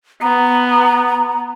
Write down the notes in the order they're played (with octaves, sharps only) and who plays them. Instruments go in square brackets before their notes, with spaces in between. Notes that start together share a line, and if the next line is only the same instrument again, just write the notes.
[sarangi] B3 [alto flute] A#5